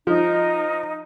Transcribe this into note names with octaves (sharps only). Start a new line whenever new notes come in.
F3 D#4